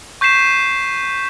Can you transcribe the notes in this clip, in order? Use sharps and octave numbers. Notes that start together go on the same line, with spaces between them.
C#6 G6 B6 C7 E7